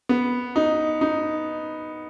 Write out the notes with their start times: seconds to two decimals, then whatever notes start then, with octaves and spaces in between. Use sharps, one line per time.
0.09 B3
0.56 D#4
1.01 D#4